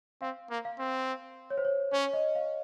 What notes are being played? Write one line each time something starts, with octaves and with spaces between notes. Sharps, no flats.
C4 F5
A#3
F5
C4
C#5
C5
C#5
C#4 C#5
D#5
F5